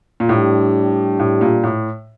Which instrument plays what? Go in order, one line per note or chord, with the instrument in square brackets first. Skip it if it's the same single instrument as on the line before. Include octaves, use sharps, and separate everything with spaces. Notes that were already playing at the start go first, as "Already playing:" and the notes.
[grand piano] A#2
[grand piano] A2 [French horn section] G3 D4 G4
[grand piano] A2
A#2
A2